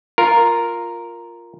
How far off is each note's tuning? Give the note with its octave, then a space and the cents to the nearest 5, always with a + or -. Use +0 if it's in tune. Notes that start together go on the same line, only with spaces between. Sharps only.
F4 +0 A#4 +0